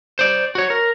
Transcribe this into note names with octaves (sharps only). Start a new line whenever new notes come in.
C5 D5
F#4 C#5
A#4